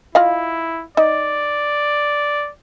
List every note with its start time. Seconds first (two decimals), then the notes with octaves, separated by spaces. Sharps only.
0.15 E4 F4 D#5 F5
0.97 D#4 D5